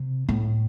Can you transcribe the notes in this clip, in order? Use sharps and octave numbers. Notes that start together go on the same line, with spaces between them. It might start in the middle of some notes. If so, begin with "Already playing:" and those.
Already playing: C3
A2